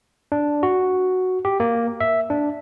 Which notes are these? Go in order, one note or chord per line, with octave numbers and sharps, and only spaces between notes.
D4
F#4
G4
A#3
E5
D4